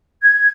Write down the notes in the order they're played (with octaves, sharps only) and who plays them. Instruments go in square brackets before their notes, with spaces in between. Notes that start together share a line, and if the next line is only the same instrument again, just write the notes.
[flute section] G#6